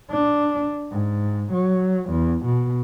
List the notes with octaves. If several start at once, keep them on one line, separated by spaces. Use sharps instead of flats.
D4
G#2
F#3
E2
B2